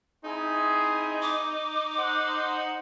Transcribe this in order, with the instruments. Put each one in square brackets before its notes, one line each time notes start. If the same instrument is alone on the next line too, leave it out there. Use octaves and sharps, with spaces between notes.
[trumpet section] C4 E4 G#4 [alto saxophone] D#4
[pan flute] D6
[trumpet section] C5 F#5